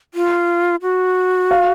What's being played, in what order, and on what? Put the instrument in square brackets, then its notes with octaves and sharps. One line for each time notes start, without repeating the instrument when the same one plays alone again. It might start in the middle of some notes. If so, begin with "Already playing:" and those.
[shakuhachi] F4
F#4
[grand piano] F5